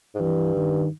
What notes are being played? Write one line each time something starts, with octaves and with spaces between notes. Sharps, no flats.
G#2
G2 E3
D#3